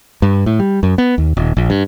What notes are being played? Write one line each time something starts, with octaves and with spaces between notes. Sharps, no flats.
G2
A2
G3
F#2
B3
D#2
D#1
A#1
G2